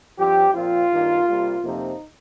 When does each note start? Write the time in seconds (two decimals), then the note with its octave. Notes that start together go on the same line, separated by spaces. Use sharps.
0.18 G2 F3 C4 G4
0.54 A#2 F3 C4 F4
0.91 G2 D#3 A#3
1.27 C3 G3 A#3
1.63 F2 C3 F3 A#3 D#4